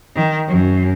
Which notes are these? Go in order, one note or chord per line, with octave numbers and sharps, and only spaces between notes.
D#3
F#2